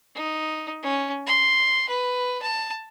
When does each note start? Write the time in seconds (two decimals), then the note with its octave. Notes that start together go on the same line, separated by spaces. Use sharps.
0.15 D#4
0.83 C#4
1.26 C6
1.89 B4
2.42 A5